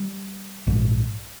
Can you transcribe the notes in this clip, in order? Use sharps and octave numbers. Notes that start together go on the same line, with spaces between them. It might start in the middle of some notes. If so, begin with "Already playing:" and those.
Already playing: G3
A#1 G#2